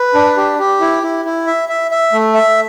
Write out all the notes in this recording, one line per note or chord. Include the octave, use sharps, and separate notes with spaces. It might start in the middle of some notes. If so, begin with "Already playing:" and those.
Already playing: B4
D4
G4
G4
E4
E4
E4
E5
E5
E5
A3
E5